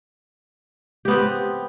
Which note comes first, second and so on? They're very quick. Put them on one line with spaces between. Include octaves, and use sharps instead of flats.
G4 B3 C4